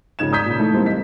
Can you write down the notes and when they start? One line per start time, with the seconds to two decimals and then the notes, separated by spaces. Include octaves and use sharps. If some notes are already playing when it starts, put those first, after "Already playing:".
0.19 G#1 C#3 F3 D#4 G#6 E7
0.32 D5 A#5 D#6 G6 G#6 B6
0.46 A#2 C#3
0.59 E3 A3 D#4
0.74 E3 G3 G#3 A#3 C4 D#4
0.86 D#5 B6